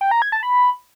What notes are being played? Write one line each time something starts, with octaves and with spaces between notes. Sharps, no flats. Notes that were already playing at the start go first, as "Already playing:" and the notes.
G5
A#5
G#6
A5
B5